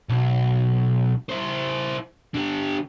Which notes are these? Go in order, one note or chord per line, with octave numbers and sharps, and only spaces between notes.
B1
E4 C5
D3 G4